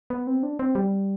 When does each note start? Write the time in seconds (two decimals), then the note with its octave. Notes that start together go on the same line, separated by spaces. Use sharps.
0.10 B3
0.27 C4
0.43 D4
0.59 C4
0.75 G3